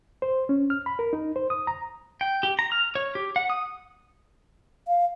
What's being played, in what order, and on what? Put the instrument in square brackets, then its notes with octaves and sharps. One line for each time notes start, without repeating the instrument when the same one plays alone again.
[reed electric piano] C5
C#4
F6
B5
A#4
D#4
C5
D#6
A#5
[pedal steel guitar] G5
G4
A#5
F6
C#5
G4
F#5
D#6
[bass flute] F5